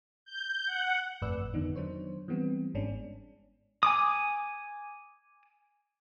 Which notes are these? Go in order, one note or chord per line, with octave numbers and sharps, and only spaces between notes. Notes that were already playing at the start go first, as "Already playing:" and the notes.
G6
F#5
G1 F2 A2 B4 D5 E6
F2 D3 D#3 B3 D4 D#4
D#3 F#3 D4 C5 C#5
E3 G3 B3 C4
G1 G#2 G#3 C#4 D4
G#5 D6 D#6